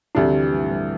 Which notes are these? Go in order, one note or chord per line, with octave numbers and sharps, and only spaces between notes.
D2 C3 F3 G3 D4
D3
E3
G2
A2
G2